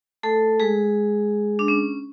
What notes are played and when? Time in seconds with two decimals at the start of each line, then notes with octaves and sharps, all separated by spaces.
0.23 A3 A4
0.60 G#3 G#4
1.59 D4
1.68 C#4